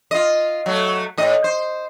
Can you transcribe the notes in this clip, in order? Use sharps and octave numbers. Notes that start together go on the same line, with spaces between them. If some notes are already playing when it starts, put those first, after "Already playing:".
F4 D#5
F#3 A3
A2 D#5
C5